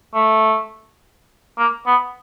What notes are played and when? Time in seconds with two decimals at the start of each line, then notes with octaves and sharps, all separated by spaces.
0.14 A3
1.58 A#3
1.86 B3